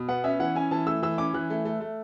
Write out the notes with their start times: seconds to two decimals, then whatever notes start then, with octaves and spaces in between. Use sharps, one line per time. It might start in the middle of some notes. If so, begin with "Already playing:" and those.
Already playing: B2
0.08 B3 F#5
0.24 C#4 E5
0.39 E3 F#5
0.56 C#4 G#5
0.71 E3 A5
0.86 A3 E6
1.02 E3 E6
1.18 C#4 D6
1.34 E3 F#6
1.50 A3
1.65 A3
1.80 A3